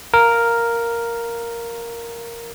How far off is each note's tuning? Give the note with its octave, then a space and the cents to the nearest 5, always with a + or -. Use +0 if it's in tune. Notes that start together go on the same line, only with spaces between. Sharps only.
A#4 +0 F5 +0